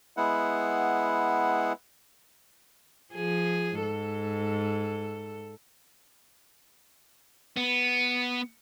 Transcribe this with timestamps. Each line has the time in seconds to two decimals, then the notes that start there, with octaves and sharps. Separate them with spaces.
0.17 G#3 B3 E4 F#5
3.13 F3 G#4
3.78 G#2 A4
7.57 B3